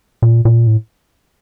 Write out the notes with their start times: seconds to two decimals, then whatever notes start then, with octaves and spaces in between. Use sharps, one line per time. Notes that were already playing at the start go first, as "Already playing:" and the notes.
0.22 A#2
0.45 A#2
0.67 A2